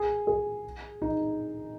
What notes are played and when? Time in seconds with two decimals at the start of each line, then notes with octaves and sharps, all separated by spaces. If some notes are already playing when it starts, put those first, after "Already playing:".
Already playing: G#4
0.27 G#4
1.02 D#4